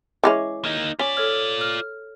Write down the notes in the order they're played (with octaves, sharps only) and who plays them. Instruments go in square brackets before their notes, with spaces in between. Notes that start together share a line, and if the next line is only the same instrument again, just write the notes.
[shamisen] E3 G#3 C#4 [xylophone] D6
[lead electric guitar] A#3 D#4
[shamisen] C#4 [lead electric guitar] F4 D5 [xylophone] B6
[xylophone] A4 C#5 F6
F6